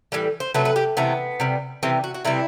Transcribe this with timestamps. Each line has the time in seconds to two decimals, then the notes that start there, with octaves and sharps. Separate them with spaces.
0.12 A2 E3 G3 B4
0.40 C5
0.54 C3 F#3 A3 B4
0.65 B4
0.76 G4
0.97 C3 E3 A3 B3
1.40 C3 G3
1.83 C3 E3 G3 C4
2.04 F#4
2.14 F#4
2.25 C3 E3 G3 E4